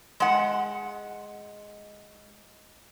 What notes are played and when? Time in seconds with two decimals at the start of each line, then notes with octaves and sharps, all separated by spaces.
0.20 G#3 F#5